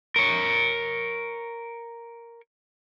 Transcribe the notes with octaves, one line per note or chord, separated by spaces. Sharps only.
A#4 C#5